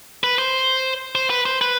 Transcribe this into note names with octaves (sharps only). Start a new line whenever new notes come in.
B4
C5
C5
B4
C5
B4